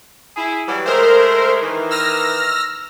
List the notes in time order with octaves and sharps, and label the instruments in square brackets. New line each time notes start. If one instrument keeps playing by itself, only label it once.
[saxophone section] E4 G#4
E3 F#3 G3
[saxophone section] G#3 A3 [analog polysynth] A#4 C5
[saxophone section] D#3 E3
[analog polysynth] E6 F6 A#6